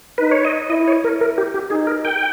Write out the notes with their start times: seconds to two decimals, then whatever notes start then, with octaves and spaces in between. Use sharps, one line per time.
0.18 D#4 B4
0.31 C#5
0.45 D#5
0.70 E4 D#5
0.88 C#5
1.04 A#4
1.21 A#4
1.38 G4
1.54 G4
1.70 D#4 G#4
1.87 A#4
2.05 G5